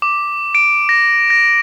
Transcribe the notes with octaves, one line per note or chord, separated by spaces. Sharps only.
D6
D7
A#6
A#6